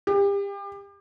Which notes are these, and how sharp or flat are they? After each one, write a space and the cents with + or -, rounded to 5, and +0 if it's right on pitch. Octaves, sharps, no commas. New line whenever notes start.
G4 +35